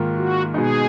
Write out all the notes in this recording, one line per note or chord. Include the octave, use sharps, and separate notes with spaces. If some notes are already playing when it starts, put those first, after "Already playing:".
Already playing: G#2 D#3 A#3 F4
F#4
B2 G#3 B3 D#4 G#4